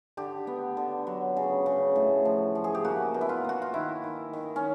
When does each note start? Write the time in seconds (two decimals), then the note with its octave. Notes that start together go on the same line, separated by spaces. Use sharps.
0.17 D3 G4
0.47 B3
0.77 D3
1.07 F#3
1.37 C#3
1.66 C#3
1.96 A2
2.25 F3
2.55 F3
2.64 G#4
2.75 G4
2.84 A#3 F#4
3.14 B2
3.21 E4
3.29 F4
3.45 A#3 F#4
3.62 F4
3.74 D#3 E4
4.04 D#3
4.33 D#3
4.56 C#4